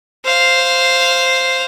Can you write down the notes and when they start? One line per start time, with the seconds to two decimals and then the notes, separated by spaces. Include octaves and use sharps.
0.25 C5 F5